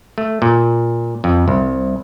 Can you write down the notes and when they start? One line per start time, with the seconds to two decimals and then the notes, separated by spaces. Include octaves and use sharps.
0.18 A3
0.42 A#2
1.24 F2
1.48 C2